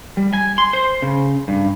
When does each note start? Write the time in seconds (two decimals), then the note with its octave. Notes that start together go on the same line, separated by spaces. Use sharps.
0.17 G3
0.33 G#5
0.58 C6
0.73 C5
1.02 C#3
1.48 G2